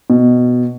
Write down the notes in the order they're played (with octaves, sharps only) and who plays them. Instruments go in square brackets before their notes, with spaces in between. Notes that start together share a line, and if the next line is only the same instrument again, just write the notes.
[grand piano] B2